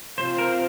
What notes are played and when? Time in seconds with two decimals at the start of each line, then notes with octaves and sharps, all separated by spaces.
0.18 C3 F3 C4 F4 C5
0.38 A#4